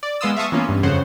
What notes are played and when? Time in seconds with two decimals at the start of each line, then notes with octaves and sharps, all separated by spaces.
0.03 D5
0.21 G#3 B3 F5 C6 D#6 E6
0.36 E5 F5 A5 C#6 D#6
0.52 E3 A#3 B3 C#4 F4
0.69 G2
0.83 F2 C#3 C#4 C5 F#5